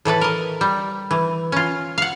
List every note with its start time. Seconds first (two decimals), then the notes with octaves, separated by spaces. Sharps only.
0.05 A2 E3 A4 B4
0.21 A#4 D#5
0.61 G3
1.11 E3
1.52 C#4 F4
1.98 F5 F#5